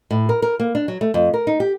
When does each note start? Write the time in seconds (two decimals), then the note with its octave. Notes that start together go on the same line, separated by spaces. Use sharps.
0.11 A2
0.29 A#4
0.42 A#4
0.60 A#3
0.75 D4
0.88 F#3
1.01 A3
1.14 F2
1.34 A#4
1.47 D#4
1.60 G4